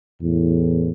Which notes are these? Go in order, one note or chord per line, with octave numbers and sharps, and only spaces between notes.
E2 A2